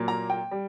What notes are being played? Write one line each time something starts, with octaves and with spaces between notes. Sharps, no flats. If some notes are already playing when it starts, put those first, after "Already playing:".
Already playing: A#2 F#3 A#3
A#5
G5
G3